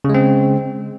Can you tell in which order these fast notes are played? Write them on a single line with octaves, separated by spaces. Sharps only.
C#3 G#3 C4